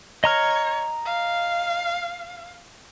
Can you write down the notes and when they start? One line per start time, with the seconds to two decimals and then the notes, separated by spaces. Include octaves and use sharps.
0.24 C#5 D#5 A#5 F6
1.06 F5